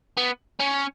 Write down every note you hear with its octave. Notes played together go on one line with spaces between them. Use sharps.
B3
C#4